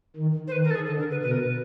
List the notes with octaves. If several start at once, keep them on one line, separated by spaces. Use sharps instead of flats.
D#3
C5
D#3 B4
A#4
A4
G#4
D3 A4
A#4
B4
B2 B4
A#4
B4